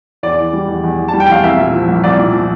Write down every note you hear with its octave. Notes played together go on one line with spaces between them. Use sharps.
E2 D5
E3
G3
E2
E2
E3
A5
G3
G5
E2 F5
C2 E5
A#2
F3
C2
C2 D5
A#2
F3